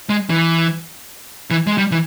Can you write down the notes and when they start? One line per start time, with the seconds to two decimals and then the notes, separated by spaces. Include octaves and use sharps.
0.09 G#3
0.30 E3
1.51 E3
1.67 G#3
1.78 G3
1.92 E3